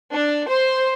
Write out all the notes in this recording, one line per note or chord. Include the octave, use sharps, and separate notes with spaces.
D4
C5